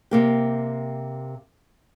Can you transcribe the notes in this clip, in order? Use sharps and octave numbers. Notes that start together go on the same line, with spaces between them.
C3 A#3 G4